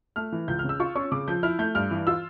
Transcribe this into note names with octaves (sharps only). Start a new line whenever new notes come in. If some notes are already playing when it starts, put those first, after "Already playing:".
A3 F6
E3
C#2 G6
F6
C#3 E6
F4 C#6
C#4 C#6
C#3 D6
F3 G6
E4 F6
A3 G6
G2 F6
E3
F4 E6